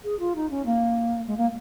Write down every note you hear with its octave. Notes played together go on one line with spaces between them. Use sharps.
G#4
F4
D#4
C#4
A#3
G#3
A#3